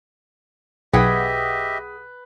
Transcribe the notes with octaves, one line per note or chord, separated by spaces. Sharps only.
B1 G4 G#4 B4 D#5 E5 F#5 G5